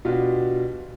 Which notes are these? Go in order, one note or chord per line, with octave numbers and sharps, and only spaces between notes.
B2 B3 D4 F4 G4